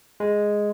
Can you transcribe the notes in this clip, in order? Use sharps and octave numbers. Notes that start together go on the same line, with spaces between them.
G#3